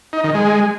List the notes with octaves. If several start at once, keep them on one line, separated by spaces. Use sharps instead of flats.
D#4
D#3
G#3